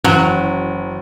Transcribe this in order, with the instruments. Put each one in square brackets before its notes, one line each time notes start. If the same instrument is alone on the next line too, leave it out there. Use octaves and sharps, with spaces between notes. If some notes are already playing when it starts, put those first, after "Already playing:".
[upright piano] F#1 [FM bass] E3 [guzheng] F#3